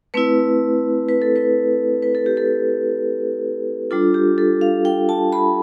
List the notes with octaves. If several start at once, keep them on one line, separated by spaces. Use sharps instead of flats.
A3 C4 E4 B4
B4
A4
B4
B4
A4
G4
A4
G3 D4 F4 A4
G4
A4
F5
G5
A5
B5